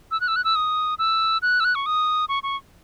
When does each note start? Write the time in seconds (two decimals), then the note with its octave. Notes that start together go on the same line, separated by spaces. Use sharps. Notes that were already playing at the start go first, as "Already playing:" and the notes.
0.11 E6
0.21 F#6
0.28 E6
0.36 F#6
0.44 E6
0.55 D#6
0.99 E6
1.42 F#6
1.60 E6
1.65 F#6
1.75 C#6
1.86 D#6
2.29 C#6
2.43 C#6